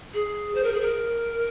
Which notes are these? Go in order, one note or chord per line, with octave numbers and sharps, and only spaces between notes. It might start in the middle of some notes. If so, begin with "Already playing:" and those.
G#4
C5
A#4
G#4
A#4